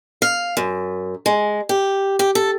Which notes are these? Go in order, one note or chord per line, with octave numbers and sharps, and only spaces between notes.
F5
F#2
G#3
G4
G4
A4